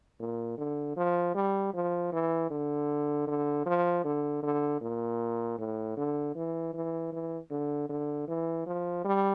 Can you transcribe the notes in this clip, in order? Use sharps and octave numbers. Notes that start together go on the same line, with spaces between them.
A#2
D3
F3
G3
F3
E3
D3
D3
F3
D3
D3
A#2
A2
D3
E3
E3
E3
D3
D3
E3
F3
G3